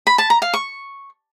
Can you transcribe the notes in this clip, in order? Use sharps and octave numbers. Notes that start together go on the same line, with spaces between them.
B5
A5
A#5
F5
C#6